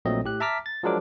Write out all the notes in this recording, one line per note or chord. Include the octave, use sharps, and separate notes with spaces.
A#1 A#2 F#3 A3 C4 D#5
A2 G4 F#6
E5 A5 A#5 D6 F6 B6
A6
F3 F#3 G#3 D4 A#4 D6